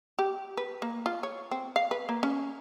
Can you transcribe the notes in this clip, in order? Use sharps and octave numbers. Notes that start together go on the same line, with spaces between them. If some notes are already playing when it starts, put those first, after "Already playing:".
G4
B4
A#3
F4
C#5
C4
F5
B4
A#3
C#4